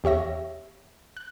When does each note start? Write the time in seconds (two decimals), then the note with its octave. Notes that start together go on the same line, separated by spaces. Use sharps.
0.04 E2 G4 C#5 E5 A#6
1.17 F#6